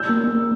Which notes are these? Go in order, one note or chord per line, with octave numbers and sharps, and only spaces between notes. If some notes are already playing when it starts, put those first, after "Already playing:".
Already playing: E6 G6
A#3
A#3